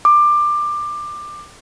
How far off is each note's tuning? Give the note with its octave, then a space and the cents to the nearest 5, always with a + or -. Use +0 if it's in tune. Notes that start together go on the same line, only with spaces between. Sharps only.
D6 +20